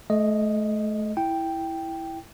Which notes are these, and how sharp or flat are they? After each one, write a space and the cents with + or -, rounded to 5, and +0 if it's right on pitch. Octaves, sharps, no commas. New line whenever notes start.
A3 -30 D#5 +0
E4 +0 G5 +0